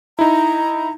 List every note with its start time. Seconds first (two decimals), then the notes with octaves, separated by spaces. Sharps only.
0.19 D#4 E4 A#5